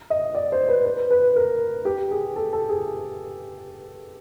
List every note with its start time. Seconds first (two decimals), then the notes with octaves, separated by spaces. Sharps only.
0.10 D#5
0.35 D5
0.52 C5
0.69 B4
0.85 B4
1.11 B4
1.36 A#4
1.85 G4
2.11 G#4
2.36 A4
2.53 A4
2.69 G#4